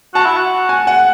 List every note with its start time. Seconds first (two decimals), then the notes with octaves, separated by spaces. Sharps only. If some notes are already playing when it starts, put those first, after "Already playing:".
0.14 F#4 A5
0.26 E4
0.37 F#4
0.69 G#5
0.87 F#5